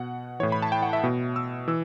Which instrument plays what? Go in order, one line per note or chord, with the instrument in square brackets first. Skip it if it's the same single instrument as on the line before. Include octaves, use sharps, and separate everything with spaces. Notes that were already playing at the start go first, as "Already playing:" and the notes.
Already playing: [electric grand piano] B2 F#5
A2 E3 C#5
B5
A5
G5
F#5
E5
B2
E6
E3 E6